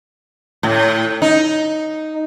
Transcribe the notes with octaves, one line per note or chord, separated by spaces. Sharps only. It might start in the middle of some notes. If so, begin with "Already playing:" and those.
A2
D#4